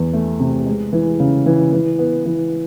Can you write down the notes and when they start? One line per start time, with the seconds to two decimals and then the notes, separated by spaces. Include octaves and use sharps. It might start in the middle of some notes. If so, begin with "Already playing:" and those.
Already playing: E2 E3
0.13 A3
0.40 C3
0.66 G#3
0.93 E3
1.20 C#3
1.46 E3
1.72 E3
1.99 B3
2.25 E3